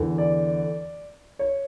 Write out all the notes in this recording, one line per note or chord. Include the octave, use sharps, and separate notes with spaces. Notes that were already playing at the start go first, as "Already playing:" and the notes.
Already playing: E2 D3
D5
C#5